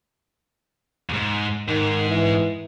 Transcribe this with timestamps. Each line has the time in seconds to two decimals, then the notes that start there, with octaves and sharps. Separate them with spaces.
1.10 D#2 G#2
1.68 G#2 D#3
2.09 E3